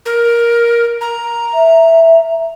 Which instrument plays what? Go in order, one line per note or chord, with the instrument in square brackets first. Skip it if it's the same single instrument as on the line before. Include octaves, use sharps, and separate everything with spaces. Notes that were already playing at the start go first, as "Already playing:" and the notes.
[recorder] A#4
A#5
[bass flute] E5